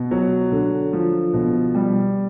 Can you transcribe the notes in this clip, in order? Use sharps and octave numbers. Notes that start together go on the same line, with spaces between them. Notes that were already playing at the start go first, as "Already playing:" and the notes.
Already playing: B2
F#3
D3
F3
B2
G3